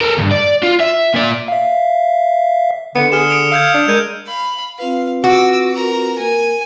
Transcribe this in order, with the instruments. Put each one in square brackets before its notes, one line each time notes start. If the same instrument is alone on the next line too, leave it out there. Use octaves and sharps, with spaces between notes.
[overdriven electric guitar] A4 A#4
D2 G2
D5
F4
E5
A#2 D5
[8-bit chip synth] E5 F5
[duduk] D3 [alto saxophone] B3 [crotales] C#7
[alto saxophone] G#4 [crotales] F6 E7
[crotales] D#6 C#7 D7
[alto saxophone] F5 [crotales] E6 G6 G#6
[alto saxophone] D4
[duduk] G#3 [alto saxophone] A#4 [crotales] G6 G#6 D#7
[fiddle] F5 B5
[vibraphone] C4 F4 B4 [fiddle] F5
[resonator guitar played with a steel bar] F#4 [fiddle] D6 E6
[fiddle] A#4 A#5
[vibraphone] A#3 A#4 [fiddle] G#5